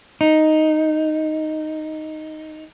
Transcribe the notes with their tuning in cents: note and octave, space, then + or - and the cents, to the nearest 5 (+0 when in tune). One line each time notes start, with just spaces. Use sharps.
D#4 +0